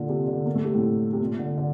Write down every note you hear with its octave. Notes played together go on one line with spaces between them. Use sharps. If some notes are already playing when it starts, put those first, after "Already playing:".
Already playing: A#2 D3
C3
D3
A#3
A3
C3
A2
C3
A#2
D3
D3